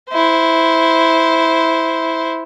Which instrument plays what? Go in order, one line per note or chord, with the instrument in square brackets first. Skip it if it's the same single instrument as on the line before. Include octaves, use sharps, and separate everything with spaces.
[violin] E4 C5